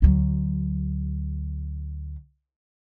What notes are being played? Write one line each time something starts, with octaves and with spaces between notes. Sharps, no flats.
D2 F#3